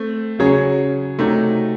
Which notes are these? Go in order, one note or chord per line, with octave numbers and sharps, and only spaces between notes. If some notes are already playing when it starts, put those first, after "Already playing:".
Already playing: A3 C4
C#3 F#3 C#4 G#4 C#5
C3 F#3 A3 D#4